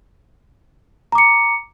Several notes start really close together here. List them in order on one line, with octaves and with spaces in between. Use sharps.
A#5 D6 C#7